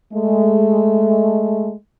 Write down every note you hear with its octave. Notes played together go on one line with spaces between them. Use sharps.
G#3 A3